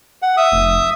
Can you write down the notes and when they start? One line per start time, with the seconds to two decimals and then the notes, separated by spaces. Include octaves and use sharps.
0.22 F#5
0.37 E5 D#6
0.52 F1